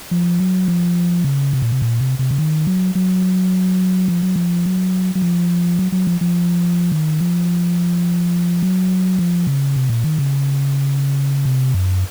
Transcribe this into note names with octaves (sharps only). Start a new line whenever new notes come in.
F3
F#3
F3
C#3
C3
A#2
C3
A#2
C3
C3
C#3
D#3
F#3
F#3
F3
F#3
F3
F#3
F#3
F3
F#3
F#3
F3
F3
D#3
F3
F#3
F3
C#3
C3
A#2
D#3
C#3
C3
F#2